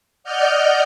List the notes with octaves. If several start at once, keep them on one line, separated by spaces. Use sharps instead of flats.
D5 D#5 F#5 F6 G6